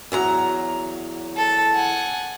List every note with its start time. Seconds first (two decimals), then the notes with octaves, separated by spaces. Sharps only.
0.12 E2 F#3 A#5
1.36 A4
1.74 F#5 G#5